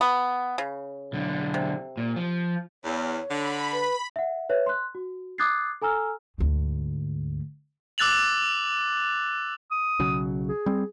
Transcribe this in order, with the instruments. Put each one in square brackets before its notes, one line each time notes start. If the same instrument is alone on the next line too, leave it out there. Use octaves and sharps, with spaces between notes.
[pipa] B3
C#3
[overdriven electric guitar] B1 D3
[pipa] C3
[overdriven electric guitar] A#2
F3
[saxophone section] E2 [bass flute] C#5
[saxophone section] D3 [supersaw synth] B5
[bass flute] B4
[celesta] E5 F#5
B4 C#5 E5
C6 F#6
F#4
D6 D#6 F#6 G#6 A6 C7
A4 G#5 A#5 E6 F6
[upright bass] D2 G#2
[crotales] D6 E6 F#6 A6 F7 F#7
[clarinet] D#6
[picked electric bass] B1 C#3 F#3
[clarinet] G#4
[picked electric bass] G3 C4